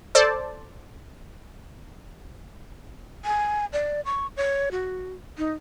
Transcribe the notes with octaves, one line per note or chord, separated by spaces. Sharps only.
A4 C5 D5 A5
G#5
D5
C#6
C#5
F#4
D#4